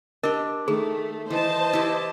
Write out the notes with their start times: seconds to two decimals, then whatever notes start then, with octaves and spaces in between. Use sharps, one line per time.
0.23 D4 G4 A#4 D#5
0.68 D#3 A3 G#4
1.30 E3 C5 D#5 A5
1.73 E4 G4